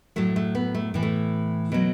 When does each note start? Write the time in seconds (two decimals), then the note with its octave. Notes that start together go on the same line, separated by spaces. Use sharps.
0.16 A2 F#3 A3
0.36 A3
0.55 B3
0.75 A3
0.94 A2 E3
1.03 A3
1.72 B2 F#3